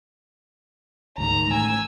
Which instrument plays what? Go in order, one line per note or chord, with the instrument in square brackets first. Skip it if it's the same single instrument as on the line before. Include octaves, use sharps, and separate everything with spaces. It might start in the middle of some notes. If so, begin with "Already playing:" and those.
[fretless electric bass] D2 G#2 D#3 [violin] A#5
[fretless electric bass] A1 A2 [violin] G#5 E6